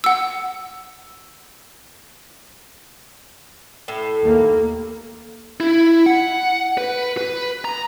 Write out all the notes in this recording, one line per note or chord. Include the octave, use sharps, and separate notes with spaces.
F#5 E6
A2
D#2 A#3
E4
F#5
B4
B4
A#5